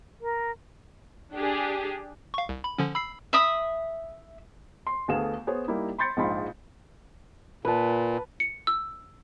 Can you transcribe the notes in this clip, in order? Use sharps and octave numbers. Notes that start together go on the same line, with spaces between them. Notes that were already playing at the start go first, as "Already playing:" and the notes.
A#4
D4 G4 G#4
F5 C#6
C2
B5
D3 F3 C#4
B5 E6 C7
E5 B5 D#6
C6
D2 A3 B3 G#4 F5 E7
B3 G#4 C5 C#5
G3 A#3 D#4 E4 G4
B5 C6 G6 A6 C#7
A#1 G#2 G#3 F4 B5 C6
A#2 B4 A5
C#7
E6